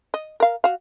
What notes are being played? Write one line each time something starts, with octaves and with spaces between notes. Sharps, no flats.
D#5
A#4 F5
F#4 F5